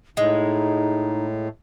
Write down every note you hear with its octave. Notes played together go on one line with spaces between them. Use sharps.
A2 G#3 D#4